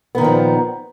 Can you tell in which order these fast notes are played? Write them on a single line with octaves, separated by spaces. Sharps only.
B3 D#3 A#2 F3